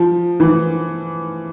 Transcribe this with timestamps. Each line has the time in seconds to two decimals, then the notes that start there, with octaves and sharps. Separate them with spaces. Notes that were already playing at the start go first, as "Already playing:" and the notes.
Already playing: F3
0.40 E3